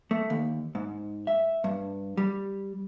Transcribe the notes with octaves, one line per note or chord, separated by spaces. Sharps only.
A3
D#2
G#2
E5
G2
G3